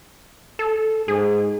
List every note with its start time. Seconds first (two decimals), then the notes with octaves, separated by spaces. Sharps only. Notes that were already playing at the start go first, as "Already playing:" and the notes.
0.59 A4
1.08 G#2 G#4